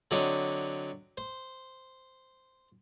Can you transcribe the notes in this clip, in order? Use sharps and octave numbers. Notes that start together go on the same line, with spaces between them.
D3 F#3 C4 D#5 D6
C5